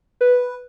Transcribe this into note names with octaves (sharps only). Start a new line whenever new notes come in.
B4